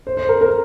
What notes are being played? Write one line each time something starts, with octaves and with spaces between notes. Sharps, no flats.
C5
C5
A#4
A#4